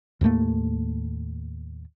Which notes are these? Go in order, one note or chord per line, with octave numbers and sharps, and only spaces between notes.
D#2 A2 A3 A#3